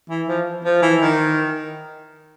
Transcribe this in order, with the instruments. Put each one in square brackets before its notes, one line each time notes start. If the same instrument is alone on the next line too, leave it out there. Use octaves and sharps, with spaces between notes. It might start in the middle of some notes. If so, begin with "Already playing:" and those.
[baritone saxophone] E3
F3
F3
E3
D#3